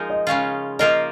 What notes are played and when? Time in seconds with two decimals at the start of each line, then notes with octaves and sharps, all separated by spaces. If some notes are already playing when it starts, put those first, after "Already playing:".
Already playing: F3 G#3 D#4 A#4
0.10 D#5
0.27 C#3 G#3 C#4 F4 F5
0.79 F3 A#3 F4 A#4 D#5